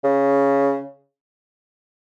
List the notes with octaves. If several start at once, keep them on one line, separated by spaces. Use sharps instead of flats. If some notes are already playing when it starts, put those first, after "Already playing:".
C#3